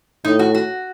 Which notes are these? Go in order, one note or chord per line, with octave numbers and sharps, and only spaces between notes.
A2 D#4
F#4
F#4